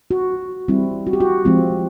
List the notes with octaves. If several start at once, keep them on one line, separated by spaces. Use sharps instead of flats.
F#4
G3 C4 E4
F#4
G4
F#4
F3 G#3 C4 F4